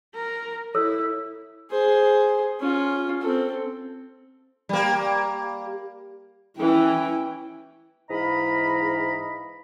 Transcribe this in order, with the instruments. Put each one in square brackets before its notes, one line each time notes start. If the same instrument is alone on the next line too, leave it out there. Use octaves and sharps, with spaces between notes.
[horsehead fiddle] A#4
[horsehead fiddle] E4 [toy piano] A4 C#5 E6
[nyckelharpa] G#4 C5
C#4 F4
C4 A4
[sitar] G3 A#3
[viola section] E3 C#4 [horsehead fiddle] E4 G5
[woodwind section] G#2 E3 D#5 F5 A#5 B5